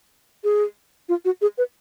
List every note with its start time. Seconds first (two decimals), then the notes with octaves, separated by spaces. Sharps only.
0.44 G#4
1.09 F4
1.25 F#4
1.41 G#4
1.58 B4